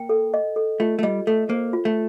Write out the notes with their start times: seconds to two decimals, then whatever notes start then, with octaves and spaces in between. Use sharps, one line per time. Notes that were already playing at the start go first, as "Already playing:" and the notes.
Already playing: A#3 G5
0.09 A4
0.34 D#5
0.56 A4
0.80 A3 F4
0.99 A3
1.03 G3 D#5
1.27 A3 A4
1.50 A#3 C5
1.73 F4
1.85 A3